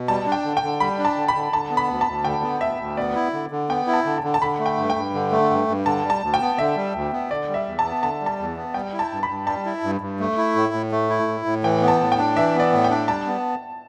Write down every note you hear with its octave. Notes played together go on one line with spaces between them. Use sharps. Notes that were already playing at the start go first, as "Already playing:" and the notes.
Already playing: B2
G3 A5
D4
G5
D3
G5
D3
G3 B5
D4
A5
D3
B5
D3
D3 A5
B3
B5
D2
A5
D2
D3 G5
B3
D2 E5
D2
B3 D5
E4
D3
D3
B3 G5
E4
A5
D3
A5
D3
A5
D3 B5
A3
G5
G2
G5
G2
D3
A3
G2
G2
D3 A5
G3
A5
D2
G5
B3
D3 E5
G3
D2
B3
D3 D5
G3
E5
E2
A5
B3
D3 A5
G3
A5
E2
B3
G3 G5
E4
A5
G2
B5
G2
G3 A5
E4
G2
G2
A3
E4
A2
A2
A3
E4
A2
A2
E3 G5
B3
A5
A2
G5
D4
E3 E5
B3 D5
A2
G5
D4
G3 A5
B3